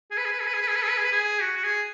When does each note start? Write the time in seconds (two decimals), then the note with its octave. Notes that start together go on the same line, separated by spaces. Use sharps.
0.11 G#4
0.18 B4
0.25 G#4
0.32 B4
0.40 G#4
0.47 B4
0.54 G#4
0.62 B4
0.68 G#4
0.76 B4
0.82 G#4
0.90 B4
0.97 G#4
1.04 B4
1.12 G#4
1.41 F#4
1.57 F#4
1.64 G#4